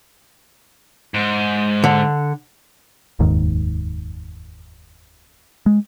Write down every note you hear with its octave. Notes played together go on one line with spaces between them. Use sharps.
G#2
D3
F1 D#2 G#2 D#3
G#3